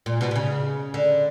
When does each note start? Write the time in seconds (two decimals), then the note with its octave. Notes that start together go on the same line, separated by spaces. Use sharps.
0.06 A#2
0.21 B2
0.31 B2
0.36 C#3
0.94 D3